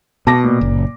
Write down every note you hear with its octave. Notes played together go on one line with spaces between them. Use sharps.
B2 A5 D6 A#6
A#2
F#1